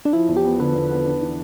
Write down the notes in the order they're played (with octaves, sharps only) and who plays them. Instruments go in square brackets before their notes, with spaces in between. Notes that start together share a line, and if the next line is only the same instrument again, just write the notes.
[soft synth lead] D4
[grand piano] F3 [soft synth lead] E4
[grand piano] E2
[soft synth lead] G4
[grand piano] B3
[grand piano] D3 [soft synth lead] B4
[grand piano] E2
B3
D4
E3